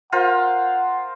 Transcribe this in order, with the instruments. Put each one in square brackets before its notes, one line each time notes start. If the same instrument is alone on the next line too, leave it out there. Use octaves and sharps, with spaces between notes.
[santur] F4 A#4 C5 [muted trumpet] F#5